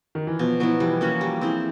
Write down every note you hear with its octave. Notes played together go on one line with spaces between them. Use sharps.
D#3
E3
B2 F3
F#3 B3 E4
E3 G3
A#3 C#4 F#4
G3
C4 E4 G#4